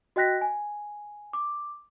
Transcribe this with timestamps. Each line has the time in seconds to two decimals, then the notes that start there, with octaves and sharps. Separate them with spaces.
0.16 F#4 D#5 G5 F#6 A#6 B6
0.41 G#5
1.33 D6